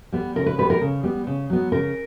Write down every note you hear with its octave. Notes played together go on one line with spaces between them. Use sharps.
G3 B3
C#3 A#4
B4
G3 B3 B4
A#4
C#3
G3 B3
C#3
F#3 B3
C#3 A#4